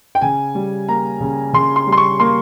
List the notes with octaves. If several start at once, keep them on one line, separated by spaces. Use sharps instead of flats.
G5
C#3 G#5
G3
A#3 A#5
C#3
C#3 C6
C6
G3
C6
C#6
A#3 C6